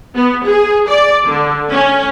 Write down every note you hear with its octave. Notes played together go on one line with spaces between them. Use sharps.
B3
G#4
D5
D3
C#4